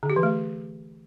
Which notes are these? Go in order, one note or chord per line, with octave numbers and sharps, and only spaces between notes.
D3
G4
E3
A3